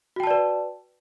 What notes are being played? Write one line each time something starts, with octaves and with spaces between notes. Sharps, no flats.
F#4 B4 D5 G5 A5